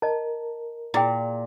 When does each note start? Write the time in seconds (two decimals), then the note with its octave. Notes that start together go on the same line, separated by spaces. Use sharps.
0.02 A#4 D#5 A5
0.94 A#2 E4 G#4 G5